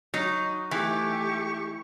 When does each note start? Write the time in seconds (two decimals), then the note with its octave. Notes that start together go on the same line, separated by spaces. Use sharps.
0.14 F#3 D#4
0.71 E3 A3 G4 C#6